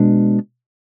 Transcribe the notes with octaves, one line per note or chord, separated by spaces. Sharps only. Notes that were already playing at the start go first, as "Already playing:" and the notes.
Already playing: B2 G#3 D4